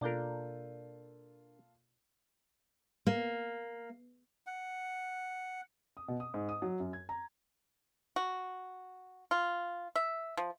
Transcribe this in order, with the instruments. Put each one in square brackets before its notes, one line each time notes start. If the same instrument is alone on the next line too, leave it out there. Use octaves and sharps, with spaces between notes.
[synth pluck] B2 D5 G6 [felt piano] A#3 F4 A4 [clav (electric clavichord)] D4 A#4
[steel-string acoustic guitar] A#3
[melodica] F#5
[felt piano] D#6
B2
D#6
G#2
D#6
F#3
F#2
G#6
A#5
[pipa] F#4
F4
E5
F3